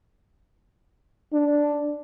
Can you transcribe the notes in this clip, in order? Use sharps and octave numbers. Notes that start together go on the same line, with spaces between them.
D4